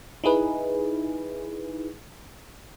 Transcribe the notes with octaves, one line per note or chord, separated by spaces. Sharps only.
D#4 E4 G#4 B4